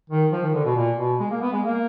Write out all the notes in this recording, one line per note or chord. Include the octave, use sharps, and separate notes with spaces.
D#3
F3
D#3
D3
B2
A#2
B2
G#3
A#3
B3
G#3
A#3